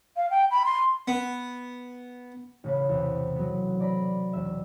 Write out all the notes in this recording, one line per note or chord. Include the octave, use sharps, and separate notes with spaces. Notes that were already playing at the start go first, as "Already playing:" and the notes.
F5
G5
B5
C6
B3
A1 C#3 B4
E2 C3
F#3 B3
D5 A#5 B5
E1 E5